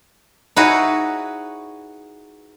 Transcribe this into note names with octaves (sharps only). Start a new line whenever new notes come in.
D#4 E4 F#4 G#4 B4 C#5